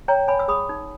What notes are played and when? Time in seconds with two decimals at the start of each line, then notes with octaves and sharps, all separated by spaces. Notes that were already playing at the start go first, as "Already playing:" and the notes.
0.08 C#5 G5 A#5
0.28 C#5 G#5 B5
0.39 E6
0.48 G#4 B5 D#6
0.69 D#4